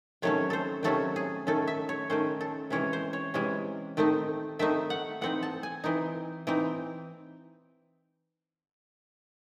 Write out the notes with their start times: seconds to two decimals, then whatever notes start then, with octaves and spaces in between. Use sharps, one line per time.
0.22 C3 D#3 F#3 A3 C#4 C#5
0.50 A4 C5
0.83 C3 D#3 F#3 A3 C#4 A4
1.16 G#4
1.47 D#3 A3 C#4 A4
1.68 E5
1.89 C#5
2.10 D#3 A3 C#4 C5
2.41 A4
2.70 C3 E3 G#3 C#4 C#5
2.93 C5
3.13 C#5
3.34 C3 E3 G#3 C#4
3.97 D#3 A3 C4 D#4
4.59 D#3 A3 C4 D#4 E5
4.90 F#5
5.21 E3 C4 D#4 F#5
5.43 A5
5.63 G#5
5.84 E3 C4 D#4
6.47 E3 C4 D#4